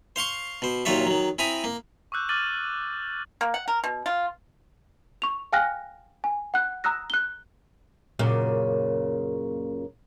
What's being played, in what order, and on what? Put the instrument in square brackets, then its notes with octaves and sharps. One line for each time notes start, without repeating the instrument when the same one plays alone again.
[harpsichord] C5 F5 C6 C#6
B2 C5
D#2 A#2 F#3 F4 C#5 E5
D#3 F#3
C4 E4 G#5 A#5 B5 D#6
A#3
[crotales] C#6 D6 E6 F#6 G6
D6 F6 A6 D#7 F#7
[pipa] A#3
F#5
A#4
B2
F4
[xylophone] C#6 F7
F5 G5 G#5 F6 F#6 A#6
G#5
F#5 F#6
A#5 D#6 E6 F#6 A#6
F#6 G7
[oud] F#2 A#2 C#3